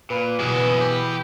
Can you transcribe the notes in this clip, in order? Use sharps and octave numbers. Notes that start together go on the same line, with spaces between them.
A#2 B4
E2 B2 F#3 E4 G#4
G4